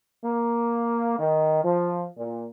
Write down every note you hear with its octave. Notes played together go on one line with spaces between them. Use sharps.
A#3
D#3
F3
A#2